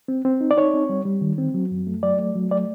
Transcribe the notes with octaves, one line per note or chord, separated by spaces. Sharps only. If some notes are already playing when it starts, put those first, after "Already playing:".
C4
C4
D#4
D5
D#4 C#5
C4
G3
G3
D#3
C4
F#3
F#2
A3
F#3 D5
A3
F#3
A3 D5